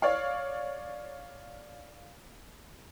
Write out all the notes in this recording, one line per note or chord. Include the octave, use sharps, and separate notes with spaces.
C#5 D5 F5